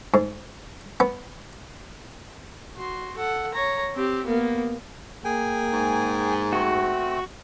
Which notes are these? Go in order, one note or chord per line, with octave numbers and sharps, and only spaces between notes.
G#2
B3
F#4 C6
A4 F#5
C#5 A#5
C4 G4
A#3 B3
A#3 G#4 G5 G#5
G#2
A3 C4 F#4